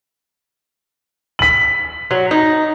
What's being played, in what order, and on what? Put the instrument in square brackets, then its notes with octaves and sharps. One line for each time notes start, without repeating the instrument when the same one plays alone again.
[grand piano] B6 F#7
[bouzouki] F#3
D#4